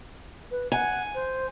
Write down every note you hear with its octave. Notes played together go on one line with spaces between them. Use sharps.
B4
F#5 G#5
C5